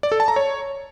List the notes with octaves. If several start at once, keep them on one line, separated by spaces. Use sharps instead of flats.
D5
A4
A5
A#5
C#5